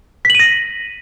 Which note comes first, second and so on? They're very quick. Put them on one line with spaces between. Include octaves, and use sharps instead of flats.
B6 F#7 D#7 A#6